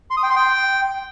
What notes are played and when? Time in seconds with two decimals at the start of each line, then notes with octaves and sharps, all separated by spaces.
0.10 C6
0.17 D#6
0.23 G5
0.30 C6
0.36 G5